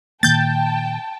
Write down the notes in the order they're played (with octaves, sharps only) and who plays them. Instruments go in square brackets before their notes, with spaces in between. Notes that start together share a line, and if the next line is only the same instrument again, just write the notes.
[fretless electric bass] A#2 D#3 A#3 [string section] G5 A5 [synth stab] G6 A6